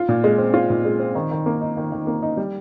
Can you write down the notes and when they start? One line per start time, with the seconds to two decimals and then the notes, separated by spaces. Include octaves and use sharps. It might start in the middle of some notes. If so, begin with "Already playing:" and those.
Already playing: F4
0.09 A#2
0.24 G#3
0.38 C4
0.54 F4
0.70 A#2
0.85 G#3
1.00 C4
1.15 D#3
1.31 D#3
1.46 A#3
1.61 D#4
1.77 D#3
1.92 D#3
2.07 A#3
2.22 D#4
2.37 G3